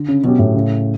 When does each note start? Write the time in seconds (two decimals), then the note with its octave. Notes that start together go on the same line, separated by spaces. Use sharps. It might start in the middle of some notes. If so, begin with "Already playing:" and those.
Already playing: D3
0.08 C#3
0.24 B2 F#3 C#4 G4
0.39 A2
0.54 C#3